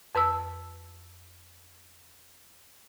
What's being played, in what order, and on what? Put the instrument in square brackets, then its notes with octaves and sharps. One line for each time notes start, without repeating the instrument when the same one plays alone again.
[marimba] F2 B4 A5 E6